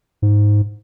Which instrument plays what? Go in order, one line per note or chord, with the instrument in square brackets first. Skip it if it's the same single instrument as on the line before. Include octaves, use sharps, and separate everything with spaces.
[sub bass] G#2